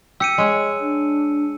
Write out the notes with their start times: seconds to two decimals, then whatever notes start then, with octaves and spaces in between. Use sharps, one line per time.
0.20 G4 E6 C#7 D#7
0.38 G#3 C#5
0.80 D4